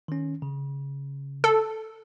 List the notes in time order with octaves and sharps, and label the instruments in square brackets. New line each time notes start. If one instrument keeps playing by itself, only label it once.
[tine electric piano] D#3 C#4
C#3
[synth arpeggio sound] A4